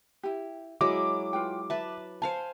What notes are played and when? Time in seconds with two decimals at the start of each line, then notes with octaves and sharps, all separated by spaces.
0.23 E4 G4
0.81 F#3 G#3 E4 D#5 D6
1.33 F4 B4 G5
1.70 B4 E5 A5
2.22 C5 F5 G#5 A5